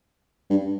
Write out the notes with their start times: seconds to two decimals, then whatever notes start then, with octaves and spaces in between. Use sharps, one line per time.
0.50 G2